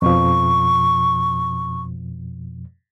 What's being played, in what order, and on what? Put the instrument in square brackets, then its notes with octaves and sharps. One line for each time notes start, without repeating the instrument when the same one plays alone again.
[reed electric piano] F2 B2 F3 [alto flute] C#6